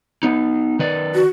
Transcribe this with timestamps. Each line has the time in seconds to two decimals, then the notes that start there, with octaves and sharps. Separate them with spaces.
0.23 B3 D#4
0.79 D#3 B4 D5
1.15 F#4